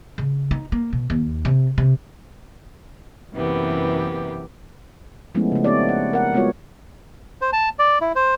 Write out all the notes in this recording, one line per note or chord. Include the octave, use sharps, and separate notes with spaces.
C#3
D#4
A#3
B2
D#2
C3
C3
F#2 C3 E3 A#3 B3 G4
F3 G#3 A3 B3 C#4 E4
C#3 A3
B3 C4 D#4 G4 C#5 D5
F#5
A#4 F#5
G3 G#3 B3 F4 F#4 C#5
C5
A5
D5
E4
C5